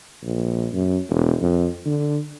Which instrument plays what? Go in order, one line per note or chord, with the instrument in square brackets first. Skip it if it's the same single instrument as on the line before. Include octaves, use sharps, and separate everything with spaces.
[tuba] A#1
F#2
E1
F2
D3